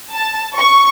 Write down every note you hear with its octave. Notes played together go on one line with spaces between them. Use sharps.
A5
C#6